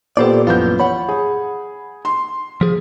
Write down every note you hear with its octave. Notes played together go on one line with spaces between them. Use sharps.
A#2 B3 G4 A4 C5 D5
A#1 F#2 E3 B3 F4 G6
C#5 F#5 B5
G#4
C6
F3 G#4